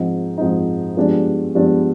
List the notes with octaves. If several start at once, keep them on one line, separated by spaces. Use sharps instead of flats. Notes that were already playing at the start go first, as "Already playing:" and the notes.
Already playing: G#2 F3 C4 D#4
G#2 F3 C4 D#4
G2 F3 G#3 B3 D4
G2 F3 G#3 B3 D4